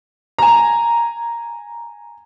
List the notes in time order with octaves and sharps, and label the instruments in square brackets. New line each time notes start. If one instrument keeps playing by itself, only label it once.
[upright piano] G#5 A#5